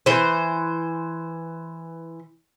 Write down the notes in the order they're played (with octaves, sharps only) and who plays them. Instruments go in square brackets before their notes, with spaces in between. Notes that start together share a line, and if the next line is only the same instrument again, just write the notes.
[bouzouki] E3 C5